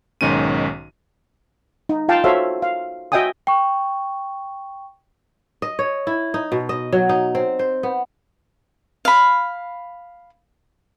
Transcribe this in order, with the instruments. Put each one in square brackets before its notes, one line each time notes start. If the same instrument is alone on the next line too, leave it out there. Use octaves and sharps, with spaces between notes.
[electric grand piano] B1 G#2 D#3 C#4 D#7
[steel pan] D#4
F4 F5 G5 A5
F#4 A4 C5 C#5 E5 F5
F5
F#4 D#5 E5 G5 G#5 D#6
[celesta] G5 C#6
[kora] D#5
C#5
E4
D#4
B2
D#5
F#3
D#4
C4
C5
B3
[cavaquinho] F5 B5